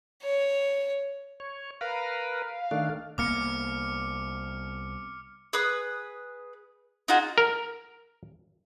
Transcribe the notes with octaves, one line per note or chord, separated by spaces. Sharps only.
C#5
C#5
A#4 B4 F5
D#3 A3 D4
C2 A#3 B3 D6 F6 C#7
G#4 B4 D#6
D#4 F4 F#4 G#4
A#4